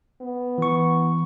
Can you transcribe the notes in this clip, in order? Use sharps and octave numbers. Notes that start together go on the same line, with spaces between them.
B3
E3 C#6